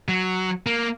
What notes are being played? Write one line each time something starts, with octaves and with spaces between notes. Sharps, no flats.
F#3
A#3